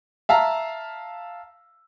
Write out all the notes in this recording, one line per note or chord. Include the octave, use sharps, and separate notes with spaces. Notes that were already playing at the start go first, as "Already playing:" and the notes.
E5 F5 A5 A#5